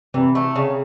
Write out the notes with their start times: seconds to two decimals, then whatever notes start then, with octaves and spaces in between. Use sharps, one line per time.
0.14 C3 E3
0.35 A3
0.56 C#3